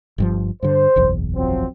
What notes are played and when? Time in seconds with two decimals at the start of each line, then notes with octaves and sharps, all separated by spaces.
0.18 G1 G2 F3
0.63 G2 D3 C5
0.96 F#1 B1 E2
1.35 F3 F#3 C4